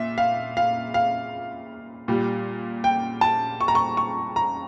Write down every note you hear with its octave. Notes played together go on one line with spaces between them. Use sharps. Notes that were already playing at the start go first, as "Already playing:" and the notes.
Already playing: A#2 E5
F5
F5
F5
A#2 G3
G5
A5
C#6
A#5
C#6
C#6
A#5